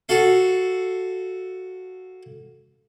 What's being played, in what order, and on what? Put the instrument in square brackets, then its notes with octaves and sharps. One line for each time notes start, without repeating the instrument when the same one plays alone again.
[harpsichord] F#4 A4 F5